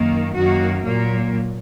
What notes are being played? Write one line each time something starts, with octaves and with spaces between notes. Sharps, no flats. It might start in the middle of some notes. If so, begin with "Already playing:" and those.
Already playing: F#2 D#3 A#3
F#2 D#3 A#3 F#4
A#2 F#3 A#3